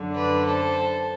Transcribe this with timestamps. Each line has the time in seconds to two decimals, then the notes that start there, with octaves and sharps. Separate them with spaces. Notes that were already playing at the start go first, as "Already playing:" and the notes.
Already playing: F#2 D3
0.15 B4 D5
0.45 A4 C5